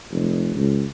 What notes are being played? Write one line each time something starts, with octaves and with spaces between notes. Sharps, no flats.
F1
C#2